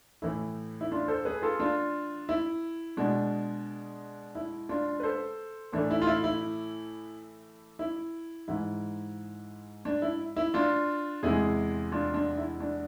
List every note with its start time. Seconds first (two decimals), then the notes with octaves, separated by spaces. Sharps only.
0.22 A2 E3 A3 E4
0.81 E4
0.92 D4 F4
1.08 A4 C5
1.25 G#4 B4
1.42 F4 A4
1.60 D4 F4
2.29 E4
2.97 B2 G#3 D4
4.35 E4
4.69 D4 F4
5.00 B4
5.03 A4 C5
5.73 A2 E3 A3 D4
5.91 E4
6.02 F4
6.07 E4
6.24 E4
7.79 E4
8.48 G#2 E3 G#3 E4
9.85 D4
10.02 E4
10.36 E4
10.54 D4 F4
11.23 E2 C3 G#3 E4 G#4
11.92 D4 F4
12.14 D4
12.37 E4
12.60 D4